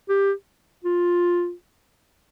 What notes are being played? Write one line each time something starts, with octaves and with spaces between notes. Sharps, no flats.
G4
F4